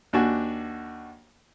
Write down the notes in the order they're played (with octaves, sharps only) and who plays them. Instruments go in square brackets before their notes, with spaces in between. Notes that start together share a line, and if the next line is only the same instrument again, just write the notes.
[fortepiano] D#2 D4 F#4 G#5